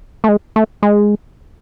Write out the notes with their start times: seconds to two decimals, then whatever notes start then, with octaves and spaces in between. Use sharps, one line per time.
0.24 A3
0.28 G#3
0.56 A3
0.83 G#3